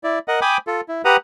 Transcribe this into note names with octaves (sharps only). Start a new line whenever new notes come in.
E4 D5
A#4 D#5 F#5
G5 G#5 B5 D6 D#6
F4 A4
E4
G4 B4 F#5 A#5 D#6